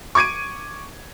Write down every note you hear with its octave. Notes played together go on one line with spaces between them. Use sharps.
C#6 D6 G#6 D7 D#7